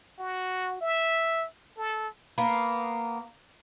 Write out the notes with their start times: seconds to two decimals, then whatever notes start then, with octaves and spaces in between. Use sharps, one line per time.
0.19 F#4
0.81 E5
1.78 A4
2.38 A#3 B3